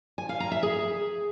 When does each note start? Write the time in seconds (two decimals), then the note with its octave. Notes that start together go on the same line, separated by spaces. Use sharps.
0.18 G#5
0.29 F5
0.40 A#5
0.52 E5
0.63 G#4